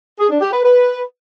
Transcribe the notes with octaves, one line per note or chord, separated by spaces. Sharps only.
G#4
D4
G4
B4
B4